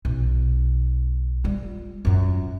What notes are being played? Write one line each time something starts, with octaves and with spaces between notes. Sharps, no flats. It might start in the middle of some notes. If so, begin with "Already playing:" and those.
B1
G3 F4
F#2 F4